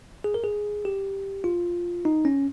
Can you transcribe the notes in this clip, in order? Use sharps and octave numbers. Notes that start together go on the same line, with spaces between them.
G#4
A#4
G#4
G4
F4
D#4
C#4